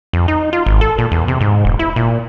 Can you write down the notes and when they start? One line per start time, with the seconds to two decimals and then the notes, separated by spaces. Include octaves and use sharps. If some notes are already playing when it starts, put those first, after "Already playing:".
0.13 F2
0.28 D#4
0.53 F4
0.66 G#1
0.81 A4
0.98 A#2
1.12 E2
1.28 C3
1.41 G#2
1.65 E1
1.79 E4
1.96 A#2